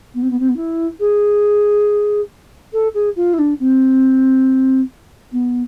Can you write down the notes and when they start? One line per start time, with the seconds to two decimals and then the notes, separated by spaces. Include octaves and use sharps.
0.14 B3
0.22 C4
0.31 B3
0.40 C4
0.49 B3
0.56 E4
1.00 G#4
2.73 A4
2.94 G#4
3.16 F4
3.34 E4
3.39 D4
3.60 C4
5.32 B3